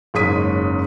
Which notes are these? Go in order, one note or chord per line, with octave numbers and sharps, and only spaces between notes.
F#1 G#2 C#4 D#6 B6 D#7